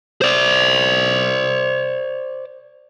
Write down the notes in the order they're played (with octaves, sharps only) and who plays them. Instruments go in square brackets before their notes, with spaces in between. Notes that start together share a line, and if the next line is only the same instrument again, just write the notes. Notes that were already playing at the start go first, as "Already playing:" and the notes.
[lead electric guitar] C5 D5